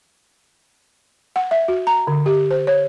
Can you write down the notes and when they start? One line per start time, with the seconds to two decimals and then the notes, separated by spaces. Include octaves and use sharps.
1.36 F#5
1.51 E5
1.68 F#4
1.87 A#5
2.07 D3
2.26 G4
2.50 C5
2.67 C#5